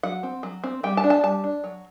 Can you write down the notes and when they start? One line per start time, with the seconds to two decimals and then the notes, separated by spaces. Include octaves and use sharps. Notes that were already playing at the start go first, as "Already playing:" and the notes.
0.03 F#3 F#5
0.23 C4
0.43 F#3
0.64 C4
0.83 G3 G5
0.97 A5
1.04 D4
1.10 A5
1.23 G3 A5
1.44 D4
1.64 F#3